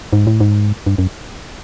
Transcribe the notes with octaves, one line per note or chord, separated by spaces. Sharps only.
G#2
A2
G#2
G2
F#2